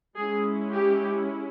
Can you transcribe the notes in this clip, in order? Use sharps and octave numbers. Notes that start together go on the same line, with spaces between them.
G#3 C#4 E4 G#4
G4